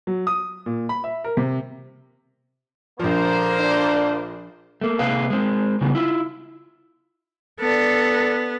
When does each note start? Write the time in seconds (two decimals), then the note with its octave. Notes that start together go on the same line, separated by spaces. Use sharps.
0.07 F#3
0.27 D#6
0.66 A#2
0.89 B5
1.04 E5
1.24 A#4
1.37 C3
2.99 A#1 D3 F3 A#3 C5
3.60 D4
4.81 A3 A#3
4.99 C3 A#3 G#4 B4 F5
5.30 G#3 C4
5.81 C#3 E3 G3 B3
5.95 E4 F4
7.60 B3 D4 A4